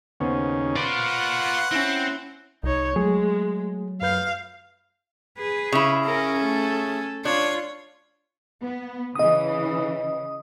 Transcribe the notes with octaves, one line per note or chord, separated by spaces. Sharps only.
D#2 C#3 B3 C#4 C5
F4 B4 D5 F#5 C6 C#6
C4 C#4 E4
C2 D#4 C#5
F#3 G#3 A3 G#4
F#2 B4 F5 G6
G#4 B4
C#3 E4
C#4 A#4
A3 A4
D4 F4 C#5
B3
C#3 E3 D#5 D#6